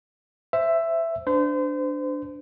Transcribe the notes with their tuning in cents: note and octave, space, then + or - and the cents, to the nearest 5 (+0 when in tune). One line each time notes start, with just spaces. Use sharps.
C5 +0 E5 +10
D4 +0 C5 -35